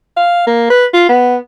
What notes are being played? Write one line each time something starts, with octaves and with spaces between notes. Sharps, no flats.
F5
A#3
B4
F4
B3